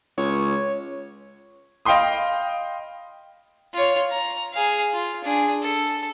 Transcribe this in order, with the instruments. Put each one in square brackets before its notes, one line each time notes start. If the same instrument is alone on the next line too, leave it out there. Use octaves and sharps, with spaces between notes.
[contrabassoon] C#2 [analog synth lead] C#5
[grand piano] D#5 F5 G5 B5 C6 D#6
[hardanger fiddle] F4 C#5
A#5
G#4 F5
F4
D4 G#4
A4